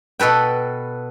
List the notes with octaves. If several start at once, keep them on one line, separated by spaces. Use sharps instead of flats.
B2 A4 B4 G5